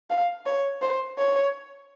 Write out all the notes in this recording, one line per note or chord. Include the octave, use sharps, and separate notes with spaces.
F5
C#5
C5
C#5